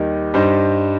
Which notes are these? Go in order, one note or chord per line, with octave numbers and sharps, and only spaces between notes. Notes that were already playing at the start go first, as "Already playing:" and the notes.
Already playing: D#2 D#3 G3 D#4
G2 G3 D#4 C5